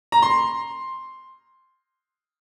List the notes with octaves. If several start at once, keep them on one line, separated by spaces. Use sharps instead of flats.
A#5
C6